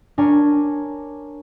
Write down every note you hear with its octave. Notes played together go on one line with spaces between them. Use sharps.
D4 A#4 C#5 G#5